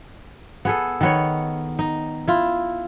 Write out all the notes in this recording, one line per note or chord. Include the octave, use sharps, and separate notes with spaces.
B3 G#4 A4
D#3 B3 C#5
D#4
E4 F4